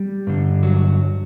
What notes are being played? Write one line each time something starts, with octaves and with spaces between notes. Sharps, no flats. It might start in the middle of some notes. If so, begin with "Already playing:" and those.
Already playing: G3
G2 D3
F#3